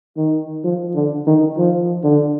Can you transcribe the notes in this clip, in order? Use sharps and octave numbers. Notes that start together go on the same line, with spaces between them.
D#3
F3
D3
D#3
F3
D3